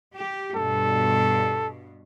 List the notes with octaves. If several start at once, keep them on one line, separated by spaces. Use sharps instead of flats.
G4
G2 B2 A4